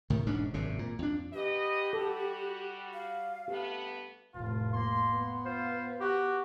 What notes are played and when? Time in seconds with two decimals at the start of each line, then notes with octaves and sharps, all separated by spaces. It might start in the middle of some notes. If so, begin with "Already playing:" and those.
0.10 C2 A2 D#3
0.26 E1 G#2 C#4 D4
0.54 G#1 F#2 C3
0.79 A#2
0.99 F2 D4
1.33 B2 G4 B4 D#5
1.93 G3 F#4 A4
2.93 F5
3.48 G2 A3 B3 G4
4.35 F1 A2 F4
4.73 A#3 C6
5.12 B3
5.45 F4 C5
6.01 F#4 G4